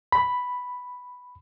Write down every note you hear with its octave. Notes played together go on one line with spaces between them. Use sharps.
B5